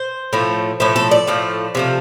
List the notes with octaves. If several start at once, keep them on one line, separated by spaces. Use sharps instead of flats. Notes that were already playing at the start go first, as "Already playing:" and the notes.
Already playing: C5
A2 F3 A3
A2 F3 A3 C5
A4
D5
A2 F3 A3
C3 F3 A3